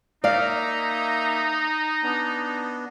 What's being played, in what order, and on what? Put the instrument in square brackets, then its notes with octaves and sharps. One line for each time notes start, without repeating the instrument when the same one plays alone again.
[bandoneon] A#3 E5 A#5 [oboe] D#4 [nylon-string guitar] D5 F5
[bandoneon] B3 D4